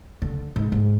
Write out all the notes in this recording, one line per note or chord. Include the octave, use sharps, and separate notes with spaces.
D3
G#2
G#2